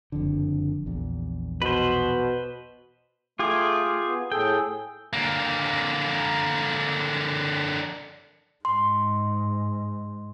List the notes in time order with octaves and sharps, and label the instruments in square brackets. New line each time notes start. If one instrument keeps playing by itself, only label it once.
[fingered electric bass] F#1 F2 D3
A#1 E2
[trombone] B2 [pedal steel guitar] B4 C5
[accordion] A3 D6 [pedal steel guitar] F4 G4 G#4
[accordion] B3
[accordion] A2 G#4 A4 [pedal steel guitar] G5
[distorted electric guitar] D3 A#3
[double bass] G#2 [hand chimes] C6